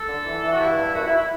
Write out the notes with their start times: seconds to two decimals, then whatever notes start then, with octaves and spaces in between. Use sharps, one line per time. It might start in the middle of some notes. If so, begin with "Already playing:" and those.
Already playing: A4
0.08 D3
0.25 E3
0.43 E3
0.53 F#4
0.60 G2 E4
0.77 G2
0.94 F#2 F#4
1.06 E4
1.17 E4